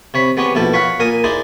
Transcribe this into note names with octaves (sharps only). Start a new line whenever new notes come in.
C3 C#5 B5
G#3 B3 G4 C#5
A#1 B2 E4 A4
C#5 F5 F#5 B5 C#6
A#2 A#4 G#5 D#6
D#4 E4 G#4 C5 D5